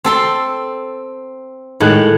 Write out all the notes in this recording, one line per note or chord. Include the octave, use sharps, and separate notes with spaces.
C4 A4 C6
A2 D#3 G#3 F#6